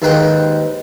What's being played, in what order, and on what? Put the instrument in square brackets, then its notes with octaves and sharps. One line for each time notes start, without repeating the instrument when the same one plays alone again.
[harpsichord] D#2 G#2 B4 G5